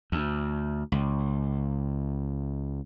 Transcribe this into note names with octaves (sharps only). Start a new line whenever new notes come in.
D2
C#2